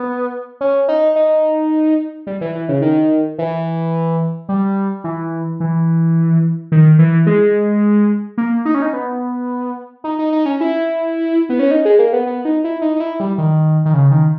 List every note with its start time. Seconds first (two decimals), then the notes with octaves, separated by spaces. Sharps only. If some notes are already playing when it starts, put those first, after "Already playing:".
Already playing: B3
0.61 C#4
0.88 D#4
1.16 D#4
2.27 G3
2.41 E3
2.55 E3
2.69 C#3
2.82 D#3
3.38 E3
4.49 G3
5.04 E3
5.60 E3
6.72 D#3
6.99 E3
7.27 G#3
8.38 A#3
8.65 D#4
8.75 C#4
8.82 D#4
8.93 B3
10.04 D#4
10.19 D#4
10.32 D#4
10.46 C#4
10.61 E4
11.49 B3
11.59 C#4
11.71 D#4
11.85 G#3
11.99 A#3
12.13 B3
12.26 B3
12.45 D#4
12.64 E4
12.82 D#4
12.96 D#4
13.00 E4
13.20 G3
13.38 D#3
13.85 D#3
13.94 C#3
14.11 D#3